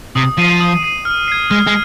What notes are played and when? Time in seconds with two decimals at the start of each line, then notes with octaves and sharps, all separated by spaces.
0.16 C3 D#6
0.38 F3 C7 D#7
0.60 D#6
0.83 C7 D#7
1.05 F6
1.28 G#6 C7
1.50 G#3 F6
1.67 G#3